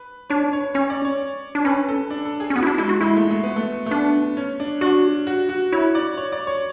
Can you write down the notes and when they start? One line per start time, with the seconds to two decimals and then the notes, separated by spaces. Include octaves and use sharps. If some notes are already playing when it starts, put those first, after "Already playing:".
Already playing: B4
0.30 D4 C#5
0.53 C#5
0.74 C#4 C#5
0.90 D5
1.05 C#5
1.55 D4
1.65 C#4 B4
1.89 A4
2.10 D4
2.25 A4
2.40 G#4
2.50 C#4
2.56 B3 F#4
2.62 E4
2.67 D4
2.78 G#3 E4
2.89 F#4
3.00 G#3 E4
3.16 A3
3.31 A3
3.44 B3
3.56 A3
3.86 A3
3.91 B3 D4
4.37 C#4
4.60 D4
4.81 D4 F#4
5.27 F#4
5.49 F#4
5.72 E4 C#5
5.95 D5
6.17 C#5
6.32 D5
6.47 C#5